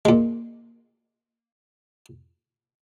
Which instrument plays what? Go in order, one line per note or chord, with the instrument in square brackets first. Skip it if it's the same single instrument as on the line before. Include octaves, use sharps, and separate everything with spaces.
[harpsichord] A#2 G#3